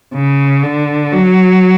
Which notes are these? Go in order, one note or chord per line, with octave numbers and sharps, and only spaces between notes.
C#3
D3
F#3